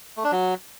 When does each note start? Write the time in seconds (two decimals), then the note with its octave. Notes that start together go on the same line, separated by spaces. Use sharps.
0.17 A3
0.24 D4
0.32 F#3